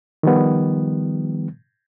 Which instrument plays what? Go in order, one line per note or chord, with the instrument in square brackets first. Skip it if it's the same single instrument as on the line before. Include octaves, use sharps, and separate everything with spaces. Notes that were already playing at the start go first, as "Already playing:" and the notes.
[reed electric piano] D#3 F3 G3 B3